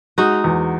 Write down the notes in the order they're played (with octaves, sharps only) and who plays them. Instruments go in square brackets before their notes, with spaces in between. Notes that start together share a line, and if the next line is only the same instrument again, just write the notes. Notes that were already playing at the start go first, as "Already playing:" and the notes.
[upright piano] G#3 [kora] D#4 F#4
[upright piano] E2